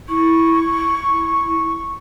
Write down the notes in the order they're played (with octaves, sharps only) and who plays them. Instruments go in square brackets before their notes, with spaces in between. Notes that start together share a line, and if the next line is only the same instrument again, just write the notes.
[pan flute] E4 [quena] C#6